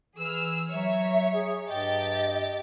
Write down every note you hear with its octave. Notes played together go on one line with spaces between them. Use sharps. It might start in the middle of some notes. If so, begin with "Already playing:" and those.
E3 G#4 E6 F6
F#3 C#5 E5
G#4
G2 G4 D#5 G5 A6